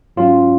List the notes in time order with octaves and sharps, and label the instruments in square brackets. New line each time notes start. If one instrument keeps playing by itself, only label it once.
[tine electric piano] G#2 F#3 C#4 F4